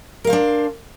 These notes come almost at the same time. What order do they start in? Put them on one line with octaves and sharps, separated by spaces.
A#4 F5 C5 D4